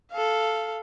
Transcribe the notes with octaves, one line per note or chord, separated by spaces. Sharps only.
A4 F5